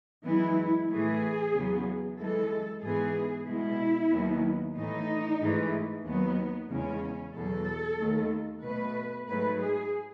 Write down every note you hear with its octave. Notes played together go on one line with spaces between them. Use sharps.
F#2 E3 G#3 B3 E4
A2 E3 A3 G#4
E2 C#3 F#3 B3
F#2 E3 G#3 A4
G#2 E3 B3 G#4
B2 G#3 B3 E4
D#2 D#3 F#3 B3
A2 E3 A3 D#4
G#2 E3 A3
D#2 D#3 F#3 B3
E2 C#3 G#3 C#4
E2 B2 F#3 A4
D#2 D#3 A3
B2 A3 B4
G#2 F#3 A3 B4
G#4